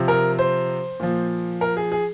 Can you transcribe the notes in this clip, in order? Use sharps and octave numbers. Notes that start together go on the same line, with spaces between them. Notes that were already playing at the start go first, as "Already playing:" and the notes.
Already playing: C3 F3
A#4
C5
A#2 F3
A#4
G#4
G#4